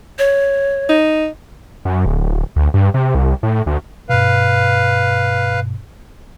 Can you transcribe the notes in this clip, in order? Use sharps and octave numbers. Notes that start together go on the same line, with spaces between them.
C#5
D#4
F#2
D1
D2
G2
C3
C2
A2
D2
G2 B2 B4 F5